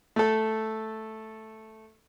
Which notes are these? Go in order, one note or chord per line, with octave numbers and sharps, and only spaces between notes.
A3 A4